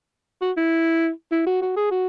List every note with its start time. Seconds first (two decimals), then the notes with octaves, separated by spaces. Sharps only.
0.41 F#4
0.57 E4
1.32 E4
1.47 F#4
1.61 F#4
1.76 G#4
1.91 F#4